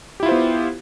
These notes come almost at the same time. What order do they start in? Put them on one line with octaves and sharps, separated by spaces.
G4 E4 F4 C5 B3